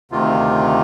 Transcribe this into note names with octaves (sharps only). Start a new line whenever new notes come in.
D2 C3 D#3 F4